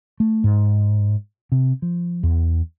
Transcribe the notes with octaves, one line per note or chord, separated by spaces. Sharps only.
A3
G#2
C3
F3
E2